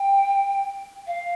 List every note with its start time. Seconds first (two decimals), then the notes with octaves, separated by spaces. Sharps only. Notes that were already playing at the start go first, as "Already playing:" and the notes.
Already playing: G5
1.07 F5